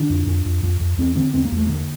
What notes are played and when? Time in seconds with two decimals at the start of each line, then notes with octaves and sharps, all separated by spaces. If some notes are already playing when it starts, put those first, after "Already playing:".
Already playing: D3 D4
0.10 F2
0.26 F2
0.45 F2
0.63 F2
0.81 F2
0.98 E2 C4
1.16 D3 C4
1.34 E2 C4
1.45 A#3
1.51 E2
1.57 A3
1.67 D3 A#3